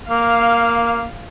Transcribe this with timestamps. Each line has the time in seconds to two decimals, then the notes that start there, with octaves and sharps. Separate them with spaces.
0.10 A#3 F5